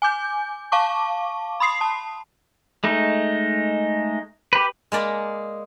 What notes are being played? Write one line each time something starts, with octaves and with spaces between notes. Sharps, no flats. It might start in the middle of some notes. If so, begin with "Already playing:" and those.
G#5 D6 G6
F5 A5 C#6 D6
B5 C6 D#6 C7
A5
G#3 A3 D#4
G4 B4
G#3 A#3 D5 B5